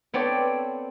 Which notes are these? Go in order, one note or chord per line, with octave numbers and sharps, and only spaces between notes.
B3 C4 A4 C#5 D5 G5